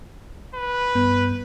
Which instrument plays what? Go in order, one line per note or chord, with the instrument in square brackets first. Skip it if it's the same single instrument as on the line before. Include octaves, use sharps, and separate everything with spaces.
[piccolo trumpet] B4
[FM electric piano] G2 B3 G6